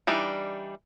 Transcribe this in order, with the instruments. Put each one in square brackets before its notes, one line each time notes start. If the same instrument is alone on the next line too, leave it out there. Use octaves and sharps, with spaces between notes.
[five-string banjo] E3 G3 D4 D#4